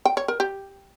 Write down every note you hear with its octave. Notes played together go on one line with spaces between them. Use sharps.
G5
C#5
A#4
G4